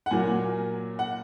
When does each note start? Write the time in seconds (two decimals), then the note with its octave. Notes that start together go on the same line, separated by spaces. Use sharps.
0.06 F#5
0.11 A#2 F#3 A#3 G#5
0.99 F#5